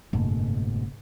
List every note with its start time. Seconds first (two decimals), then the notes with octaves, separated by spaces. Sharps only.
0.13 F#1 G#2 B2 A3